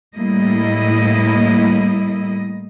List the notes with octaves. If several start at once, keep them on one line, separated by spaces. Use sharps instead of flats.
A2 G3 A#3 E4 D#5